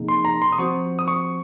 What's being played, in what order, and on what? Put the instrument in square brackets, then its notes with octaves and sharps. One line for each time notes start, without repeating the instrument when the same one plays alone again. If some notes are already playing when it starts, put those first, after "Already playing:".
Already playing: [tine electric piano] C3 F3 A#3 D#4 G#4
[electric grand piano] C6
A#5
C6
D#6
[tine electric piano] F3 C4 F#4 C5 [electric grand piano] C#6
[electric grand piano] D#6
C#6